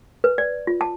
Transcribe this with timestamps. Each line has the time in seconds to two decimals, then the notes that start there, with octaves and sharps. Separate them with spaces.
0.24 B4
0.38 D5
0.67 F4
0.81 A5